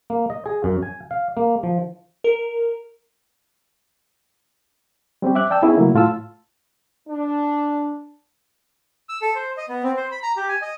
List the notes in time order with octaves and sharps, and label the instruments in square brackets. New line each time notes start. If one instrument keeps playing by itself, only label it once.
[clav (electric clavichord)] A#3
D#5
G#4
F#2
G#5
F5
A#3
F3
[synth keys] A#4
[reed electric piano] G3 C4 C#4 G4
E5 D6 F#6
D5 G5 A5 E6
B3 C#4 D#4 E4 G#4
C#3 F#3 A3 A#3 E4
A2 F4 A5 E6
[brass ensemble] D4
[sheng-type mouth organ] E6
A4
C5
D#5
B3
C4
C5
B5
A#5
G4
G#5
D#5